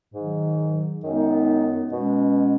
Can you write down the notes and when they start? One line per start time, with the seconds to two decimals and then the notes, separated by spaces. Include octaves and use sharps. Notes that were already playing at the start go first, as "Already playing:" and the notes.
0.13 G#2 D#3 F#3
1.03 F#2 D#3 G#3 B3 D#4
1.92 B2 G#3 C#4